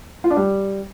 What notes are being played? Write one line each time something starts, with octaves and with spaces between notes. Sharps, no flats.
F4
D4
G3